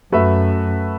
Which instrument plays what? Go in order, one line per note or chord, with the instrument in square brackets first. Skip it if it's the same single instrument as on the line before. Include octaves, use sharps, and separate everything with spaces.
[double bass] F#2 [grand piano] A3 F#4 B4 E5